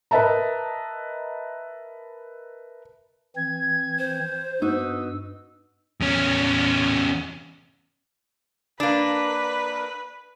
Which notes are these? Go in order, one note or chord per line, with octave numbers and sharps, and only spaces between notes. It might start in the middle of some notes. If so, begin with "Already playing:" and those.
A#4 B4 D#5 E5 A5 A#5
E3 C4 G#6
C5
G2 B3 D#4 F#4 E6
E2 C#4
A#3 D4 B4